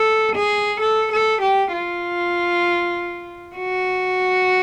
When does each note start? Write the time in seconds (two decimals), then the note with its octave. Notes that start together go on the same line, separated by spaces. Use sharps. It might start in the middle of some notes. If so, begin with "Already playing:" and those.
Already playing: A4
0.35 G#4
0.80 A4
1.12 A4
1.41 G4
1.72 F4
3.56 F#4